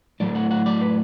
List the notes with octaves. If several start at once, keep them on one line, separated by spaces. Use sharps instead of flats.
A2 F#3 A3 D5
F#5
F#5
D5
B4